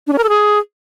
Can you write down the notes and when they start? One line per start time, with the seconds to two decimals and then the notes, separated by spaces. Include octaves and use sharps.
0.07 D4
0.13 C#4
0.18 A#4
0.24 A4
0.29 G#4